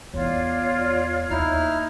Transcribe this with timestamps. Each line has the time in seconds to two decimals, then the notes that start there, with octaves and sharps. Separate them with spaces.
0.14 E2 E4 F4 C#5 D5
1.31 D#2 D#4 E4 F6